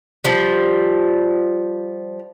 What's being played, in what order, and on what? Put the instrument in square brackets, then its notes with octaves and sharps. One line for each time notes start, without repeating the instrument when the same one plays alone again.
[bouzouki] F3 G3